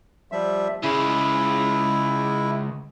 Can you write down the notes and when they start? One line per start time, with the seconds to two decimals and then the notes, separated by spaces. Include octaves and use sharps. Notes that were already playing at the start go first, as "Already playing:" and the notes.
0.32 F3 G3 E5
0.83 C#3 G#3 E4